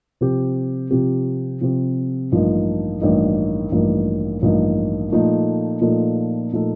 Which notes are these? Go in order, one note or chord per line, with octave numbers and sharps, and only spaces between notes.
C3 F3 C4 G4
C3 F3 C4 G4
C3 F3 C4 G4
A1 G2 F3 A#3 D#4
A1 G2 F3 A#3 D#4
A1 G2 F3 A#3 D#4
A1 G2 F3 A#3 D#4
A#2 F3 A3 D#4 A4
A#2 F3 A3 D#4 A4
A#2 F3 A3 D#4 A4